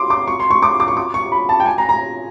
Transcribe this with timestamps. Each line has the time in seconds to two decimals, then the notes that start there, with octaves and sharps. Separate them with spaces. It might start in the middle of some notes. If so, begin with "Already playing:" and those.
Already playing: C6 D6
0.10 D6
0.28 C#6
0.40 C6
0.50 C#6
0.62 D6
0.80 D6
0.88 C#6
0.97 D6
1.14 C#6
1.32 B5
1.49 A5
1.60 G5
1.66 G#5
1.78 A#5
1.89 A#5